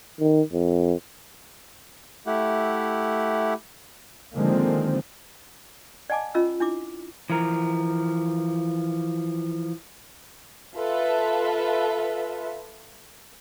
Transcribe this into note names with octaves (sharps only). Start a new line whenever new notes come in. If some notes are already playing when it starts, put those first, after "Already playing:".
D#3
F2
A3 E4 G4 F#5
D3 D#3 F3 G#3 A#3 C4
D5 D#5 F#5 G#5 A5 D6
C#4 F4 D#5 A#5 E6
D4 E4 D6
E3 F3 A#4
F4 A4 B4 E5